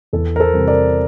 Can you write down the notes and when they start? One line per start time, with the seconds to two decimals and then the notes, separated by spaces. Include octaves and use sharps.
0.13 E2 A4
0.36 A#4
0.40 A4 C5
0.54 C3 E3 G3 C4
0.67 A#4 D5